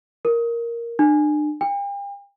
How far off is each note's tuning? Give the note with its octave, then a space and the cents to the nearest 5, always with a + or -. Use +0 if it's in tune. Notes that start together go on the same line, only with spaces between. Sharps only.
A#4 +0
D4 +40
G5 +40